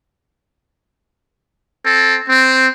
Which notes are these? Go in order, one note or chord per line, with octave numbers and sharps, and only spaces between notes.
C4 A4
C4